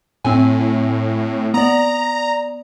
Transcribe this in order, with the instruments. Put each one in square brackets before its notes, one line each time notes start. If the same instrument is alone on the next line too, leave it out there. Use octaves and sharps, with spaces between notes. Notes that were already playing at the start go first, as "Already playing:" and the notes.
[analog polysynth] A2 [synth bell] C4 G#5
[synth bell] B3 D5 [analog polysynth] A#5